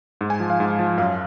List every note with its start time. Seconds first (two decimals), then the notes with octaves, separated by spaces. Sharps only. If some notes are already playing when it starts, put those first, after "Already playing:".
0.21 G#2
0.30 G#5
0.40 F3
0.50 F5
0.60 G#2
0.79 F3
0.97 F#2 F5